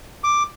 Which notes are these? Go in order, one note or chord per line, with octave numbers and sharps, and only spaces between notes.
D6